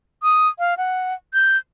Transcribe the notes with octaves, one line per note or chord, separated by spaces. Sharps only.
D#6
F5
F#5
G6